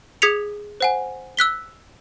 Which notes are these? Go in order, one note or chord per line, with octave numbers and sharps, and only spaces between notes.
G#4 D#6 G#6 B6 C#7 F7
C5 F#5 G#5
E6 F#6 B6 G7